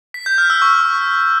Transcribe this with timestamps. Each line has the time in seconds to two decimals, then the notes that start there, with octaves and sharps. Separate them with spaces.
0.14 B6
0.26 G6
0.38 F6
0.50 E6
0.62 C#6